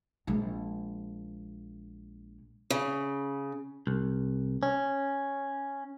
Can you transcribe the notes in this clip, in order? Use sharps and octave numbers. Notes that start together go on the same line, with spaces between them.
A#1 G#3
C#3
C2
C#4